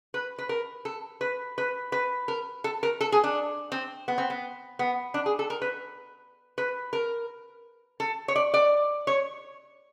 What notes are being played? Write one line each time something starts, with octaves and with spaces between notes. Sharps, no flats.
B4
B4
A#4
A4
B4
B4
B4
A#4
A4
A#4
A4
G#4
D4
C4
B3
C4
B3
B3
D4
G#4
A4
A#4
B4
B4
A#4
A4
C#5
D5
D5
C#5